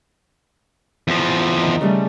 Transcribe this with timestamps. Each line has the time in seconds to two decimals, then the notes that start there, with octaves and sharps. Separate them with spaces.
1.08 E2 F3
1.62 D#3
1.81 C#3 G3 A3